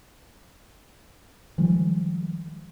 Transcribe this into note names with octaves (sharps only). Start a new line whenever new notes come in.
D#3 F3 G3 G#3